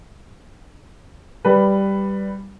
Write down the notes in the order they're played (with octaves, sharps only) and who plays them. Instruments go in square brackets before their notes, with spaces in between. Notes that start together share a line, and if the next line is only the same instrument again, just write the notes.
[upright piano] G3 B4